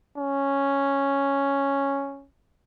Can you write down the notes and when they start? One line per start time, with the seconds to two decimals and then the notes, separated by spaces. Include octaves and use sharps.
0.18 C#4